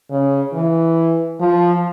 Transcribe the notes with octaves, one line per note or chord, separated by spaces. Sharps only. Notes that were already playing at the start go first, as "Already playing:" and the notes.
C#3
E3
F3